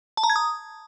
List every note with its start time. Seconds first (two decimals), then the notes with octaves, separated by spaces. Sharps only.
0.17 A5
0.23 A#5
0.30 G#6
0.36 D#6